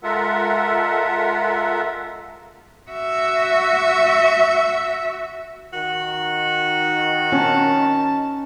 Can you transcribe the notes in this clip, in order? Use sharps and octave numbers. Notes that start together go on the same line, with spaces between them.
G#3 F4 A4 A#4 E5 F#5
F#4 E5
D#3 F#4
C#4 A5